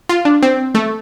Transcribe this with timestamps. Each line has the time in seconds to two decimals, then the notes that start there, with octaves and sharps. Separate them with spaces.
0.09 F4
0.25 D4
0.43 C4
0.75 A3